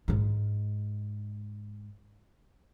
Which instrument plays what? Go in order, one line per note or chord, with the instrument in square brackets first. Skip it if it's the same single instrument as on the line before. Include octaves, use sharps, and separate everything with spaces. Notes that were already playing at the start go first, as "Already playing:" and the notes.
[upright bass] G#2 G#3